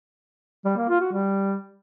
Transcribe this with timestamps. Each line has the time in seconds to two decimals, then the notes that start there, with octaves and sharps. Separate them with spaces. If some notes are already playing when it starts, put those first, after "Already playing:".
0.65 G3
0.77 A#3
0.89 F4
1.01 F#4
1.13 G3